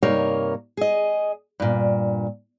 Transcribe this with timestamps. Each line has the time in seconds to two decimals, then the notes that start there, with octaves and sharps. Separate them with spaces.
0.03 G2 C3 A#3 D#4 A#4 C#5
0.77 G#4 D#5
1.60 G2 A#2